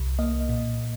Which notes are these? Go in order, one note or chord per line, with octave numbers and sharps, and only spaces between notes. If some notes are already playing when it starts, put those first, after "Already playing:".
Already playing: C2
A#3 D#5
A#2